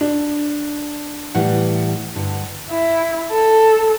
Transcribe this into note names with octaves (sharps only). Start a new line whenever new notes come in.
D4
A2 E3 G3 F#5
G2 D3
E4
A4